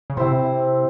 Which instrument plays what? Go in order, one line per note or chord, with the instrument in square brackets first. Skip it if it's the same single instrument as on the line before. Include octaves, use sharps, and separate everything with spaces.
[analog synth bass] C#3
[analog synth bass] C3 [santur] C4 E4 C5